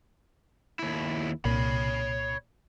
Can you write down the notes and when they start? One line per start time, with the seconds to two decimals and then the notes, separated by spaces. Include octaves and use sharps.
0.79 D#2 E4
1.45 C2 A#2 C#5 B5